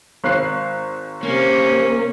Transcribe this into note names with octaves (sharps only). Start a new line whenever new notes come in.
G#1 F#6 C7
C3 A#3 C#4